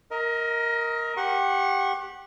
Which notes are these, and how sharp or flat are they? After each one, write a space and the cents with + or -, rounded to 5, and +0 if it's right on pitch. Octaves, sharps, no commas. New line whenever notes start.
A#4 +0 D#5 +30
G4 +0 F#5 +0 C#6 -40